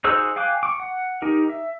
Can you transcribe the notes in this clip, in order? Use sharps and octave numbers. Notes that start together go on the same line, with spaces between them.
D#4 F#4 G#4 C5 E6
F5 G5 G#5 D6 F#6
C#6 D6
F#5
D#4 G4 A#4
E5